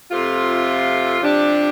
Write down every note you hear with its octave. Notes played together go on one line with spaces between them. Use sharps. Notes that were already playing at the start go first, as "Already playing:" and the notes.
F2 C3 A3 F4
C3 F3 D4 G4